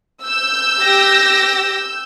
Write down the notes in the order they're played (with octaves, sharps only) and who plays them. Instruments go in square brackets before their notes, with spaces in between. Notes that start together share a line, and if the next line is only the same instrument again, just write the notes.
[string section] E6 G6
[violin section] G4 A#6